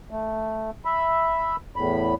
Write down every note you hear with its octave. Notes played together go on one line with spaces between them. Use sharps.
A3
E5 B5
E2 A2 B5